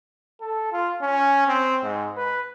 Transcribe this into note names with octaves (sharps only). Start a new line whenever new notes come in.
A4
F4
C#4
C4
G#2
B4